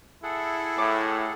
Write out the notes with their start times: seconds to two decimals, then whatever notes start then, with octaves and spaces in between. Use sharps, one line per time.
0.23 E4 G#4 A4 F#5
0.78 A2 D6